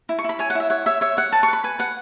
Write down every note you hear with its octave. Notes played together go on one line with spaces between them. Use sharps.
E4
C#6
E4 B5
C#5 G#5
F#5
E4 E5
C#5 F#5
C#5 E5
C#5 E5
C#5 F#5
B4 A5
C#6
B4 B5
B4 G#5
B4 F#5